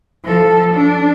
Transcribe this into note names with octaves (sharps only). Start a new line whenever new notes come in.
F3 A4
D4